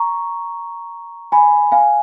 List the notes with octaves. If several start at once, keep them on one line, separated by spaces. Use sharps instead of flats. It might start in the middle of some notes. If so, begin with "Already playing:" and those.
Already playing: A#5 C#6
G#5 B5
F5 G#5